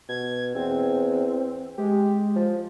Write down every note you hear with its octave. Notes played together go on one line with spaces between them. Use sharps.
B2 G#6
E2 C4
G#3 G4
F3